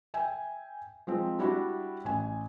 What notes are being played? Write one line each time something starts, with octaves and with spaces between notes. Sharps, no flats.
E5 G5 G#5
F3 G#3 C4
G3 D4 E4 F#4
A1 G#5